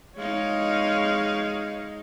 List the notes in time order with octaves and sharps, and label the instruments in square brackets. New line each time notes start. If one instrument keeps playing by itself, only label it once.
[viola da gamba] G#3 D#4 [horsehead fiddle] C#5 F5